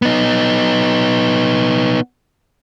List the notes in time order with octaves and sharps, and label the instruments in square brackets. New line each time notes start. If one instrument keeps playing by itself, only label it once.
[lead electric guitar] B3 D#4